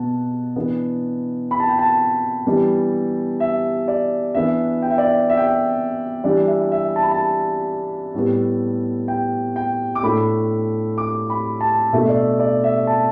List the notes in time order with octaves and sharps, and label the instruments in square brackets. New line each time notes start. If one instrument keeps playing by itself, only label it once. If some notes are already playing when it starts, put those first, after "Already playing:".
Already playing: [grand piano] B2 B3 A5
E3 B3 D4
B5
A5
G5
A5
E3 G3 B3 D4
E5
D5
E3 B3 D4 E5
G5
E5
D5
E5
E5
G5
E5
E3 G3 D4 D5
E5
E5
A5
B5
A5
A2 G3 B3
G5
G5
D6
A2 A3 D4 B5
D6
B5
A5
B2 A3 D4 E5
D5
E5
D5
E5
A5